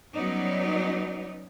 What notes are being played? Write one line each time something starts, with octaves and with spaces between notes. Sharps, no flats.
F#3 G3 B3 C#4 D#4 D5